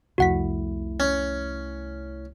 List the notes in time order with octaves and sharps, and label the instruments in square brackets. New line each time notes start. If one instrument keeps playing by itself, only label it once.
[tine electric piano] C2 A3 E4 [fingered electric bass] F2 C3 [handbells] F#4 F#5 B6
[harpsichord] C#4